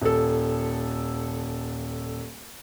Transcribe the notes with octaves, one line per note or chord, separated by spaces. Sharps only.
D#1 A4